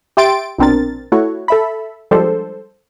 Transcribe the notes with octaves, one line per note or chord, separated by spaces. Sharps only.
G4 E5 G5 C6 A6 D7
A#1 B2 C4 D4 A#4 A6
A3 E4 F#4 C#5
A4 E5 B5
F3 G3 G#3 D4 A4 C5